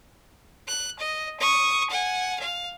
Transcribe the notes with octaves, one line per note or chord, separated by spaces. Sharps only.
F#6
D#5
C#6 D#6
F#5 G#5
F5